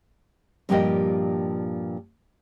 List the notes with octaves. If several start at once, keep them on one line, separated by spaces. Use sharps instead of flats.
G2 A#2 F3 G4 A#4 D#5